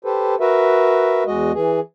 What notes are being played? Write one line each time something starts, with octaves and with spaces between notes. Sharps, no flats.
G4 A4 B4 C5
F#4 A#4 B4 E5
E2 G#3 F#4 D#5
E3 G#4